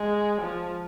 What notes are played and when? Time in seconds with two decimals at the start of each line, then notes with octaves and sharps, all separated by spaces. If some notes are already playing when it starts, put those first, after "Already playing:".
Already playing: G#3
0.42 F3